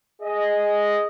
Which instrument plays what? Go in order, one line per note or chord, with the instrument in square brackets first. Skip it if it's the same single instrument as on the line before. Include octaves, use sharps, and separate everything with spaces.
[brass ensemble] G#4 D#5